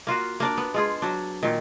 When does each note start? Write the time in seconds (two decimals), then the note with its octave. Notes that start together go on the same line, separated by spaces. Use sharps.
0.07 A#3 F4 F#4
0.40 A#3 D4 D5
0.57 B3
0.74 G#3 F4 G#4
1.02 F#3 D4
1.43 A#2 D#3